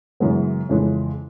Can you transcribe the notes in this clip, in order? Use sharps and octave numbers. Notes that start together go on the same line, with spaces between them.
F#2 C#3 E3 G#3 B3
F2 C#3 E3 G#3